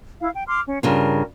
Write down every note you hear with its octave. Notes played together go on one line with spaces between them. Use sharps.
E4 F5
G5
C6 D6 F6
C#4
G2 C#3 F4 A#4